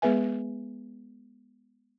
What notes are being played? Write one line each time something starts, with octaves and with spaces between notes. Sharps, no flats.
G#3 B3 G#4 B4 E5 G#5